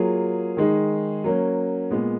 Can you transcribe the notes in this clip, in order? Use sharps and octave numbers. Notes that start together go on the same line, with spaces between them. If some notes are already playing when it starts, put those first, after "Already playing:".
Already playing: F#3 A#3 F4 G#4
D#3 G#3 D#4 G#4
F#3 A#3 C#4
A#2 G#3 B3